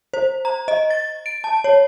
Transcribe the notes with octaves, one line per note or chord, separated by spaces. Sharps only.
C5
A#5
D#5
A6
D7
A5
C#5